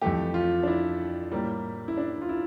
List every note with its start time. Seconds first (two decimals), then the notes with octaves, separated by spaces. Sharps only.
0.02 F2 E3 A3 G4
0.34 F4
0.63 D4
0.67 E4
1.31 A2 G3 A#3
1.88 E4
1.97 D4
2.22 F4
2.29 E4